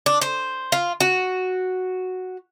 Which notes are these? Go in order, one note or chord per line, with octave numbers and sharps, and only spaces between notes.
D4
C5
F4
F#4